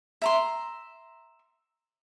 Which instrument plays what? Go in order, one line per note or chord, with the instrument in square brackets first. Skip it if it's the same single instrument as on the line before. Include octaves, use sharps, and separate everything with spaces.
[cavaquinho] E5 A#5 C6